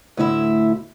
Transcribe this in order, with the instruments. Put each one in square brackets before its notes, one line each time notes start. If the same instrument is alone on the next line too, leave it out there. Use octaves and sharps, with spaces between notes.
[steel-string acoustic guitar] D2 A2 E4 E5